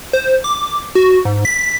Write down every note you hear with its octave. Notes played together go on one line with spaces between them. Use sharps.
C5
D6
F#4
G#2
B6